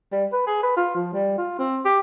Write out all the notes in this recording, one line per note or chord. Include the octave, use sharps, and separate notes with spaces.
G3
B4
G#4
B4
F4
F3
G3
F4
C4
G4